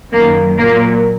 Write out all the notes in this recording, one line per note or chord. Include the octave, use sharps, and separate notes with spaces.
F#2 D#3 F#3 A#3
A#2 F#3 A#3